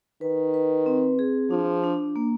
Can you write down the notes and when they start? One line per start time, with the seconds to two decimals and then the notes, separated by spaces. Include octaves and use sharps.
0.21 D#3 B4
0.54 B4
0.86 C4
1.19 G#4
1.50 F3 D4
1.84 D4
2.16 A#3